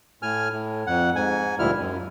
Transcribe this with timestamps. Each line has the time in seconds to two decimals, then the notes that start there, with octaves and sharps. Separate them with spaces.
0.23 A2 G#5 F6
0.52 A2
0.87 F2 F#5
1.16 G#2 G#5
1.59 D2 A#2 F3 G3 E4 F6
1.79 F#2